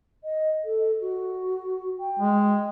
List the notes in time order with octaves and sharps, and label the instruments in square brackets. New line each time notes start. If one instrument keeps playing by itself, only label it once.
[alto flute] D#5
A4
F#4
G5
[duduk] G#3